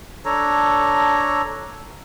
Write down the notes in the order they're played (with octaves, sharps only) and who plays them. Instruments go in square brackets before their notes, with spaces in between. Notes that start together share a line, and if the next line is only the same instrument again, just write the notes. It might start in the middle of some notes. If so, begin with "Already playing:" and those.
[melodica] D4 A4 C#5 A#5